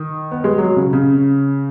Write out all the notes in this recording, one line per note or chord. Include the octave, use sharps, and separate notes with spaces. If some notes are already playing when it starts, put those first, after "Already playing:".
Already playing: D#3
B3
G#3
F#3
C#3
C#3